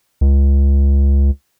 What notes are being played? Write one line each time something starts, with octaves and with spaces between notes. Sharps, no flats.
C#2